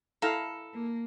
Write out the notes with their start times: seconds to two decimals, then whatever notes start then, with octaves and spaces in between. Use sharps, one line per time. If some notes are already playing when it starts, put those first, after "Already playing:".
0.22 E4 A4 F5 A#5
0.73 A#3